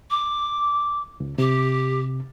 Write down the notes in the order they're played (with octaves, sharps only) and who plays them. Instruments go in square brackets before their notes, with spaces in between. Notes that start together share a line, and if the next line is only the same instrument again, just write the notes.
[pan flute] D6
[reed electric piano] C#2
[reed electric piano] C3 [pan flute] G4